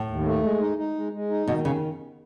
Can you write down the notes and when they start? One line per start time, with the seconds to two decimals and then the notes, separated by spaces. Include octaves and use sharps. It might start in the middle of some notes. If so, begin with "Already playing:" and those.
Already playing: A2
0.08 D#2
0.25 A3
0.43 G#3
0.61 D#4
0.78 D#4
0.95 G#3
1.13 G#3
1.30 D#4
1.47 B2 D#3
1.65 C#3